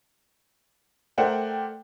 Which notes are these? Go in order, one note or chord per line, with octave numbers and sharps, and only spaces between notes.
A3 A#4 C5 D5 F#5 G5